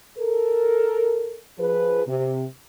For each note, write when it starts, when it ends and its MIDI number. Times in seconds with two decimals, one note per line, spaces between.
0.18 1.38 69
0.18 1.38 70
1.59 2.02 53
1.59 2.02 68
1.59 2.02 71
2.07 2.44 48